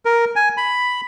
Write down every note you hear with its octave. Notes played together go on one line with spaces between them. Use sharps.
A#4
G#5
B5